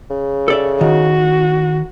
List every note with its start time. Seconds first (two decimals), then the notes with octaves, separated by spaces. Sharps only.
0.10 C#3
0.48 A4 D5 E5
0.81 D#3 F#4